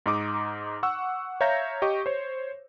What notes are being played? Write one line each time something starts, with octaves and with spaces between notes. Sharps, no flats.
G#2 D#4 D6 D#6
F#5 C#6 E6
C#5 E5 F5 A#5 G6 A#6
G4 D#5 C#6
C5 C#5